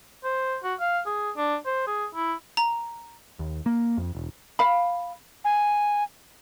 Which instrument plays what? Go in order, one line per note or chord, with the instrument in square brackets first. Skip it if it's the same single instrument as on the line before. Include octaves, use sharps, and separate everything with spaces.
[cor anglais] C5
F#4
F5
G#4
D4
C5
G#4
E4
[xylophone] A#5
[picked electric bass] D#2
A#3
F2
E1
[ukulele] F5 B5
[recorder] G#5